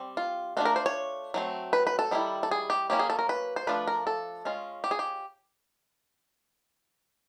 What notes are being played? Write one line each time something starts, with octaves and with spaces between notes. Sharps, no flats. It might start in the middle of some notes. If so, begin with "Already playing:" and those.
Already playing: G3 C4
F4
A3 D4 F4 F#4
A#4
C5
C#5
F#3 A3 C4
B4
B4
A4
D#3 G3 B3 E4
A4
G#4
G4
F#3 A#3 C#4 E4 G4
G#4
A4
A#4
B4
C5
F3 A3 D4 F4 B4
A#4
A4
G#3 C#4 F4
G4
G#4
G4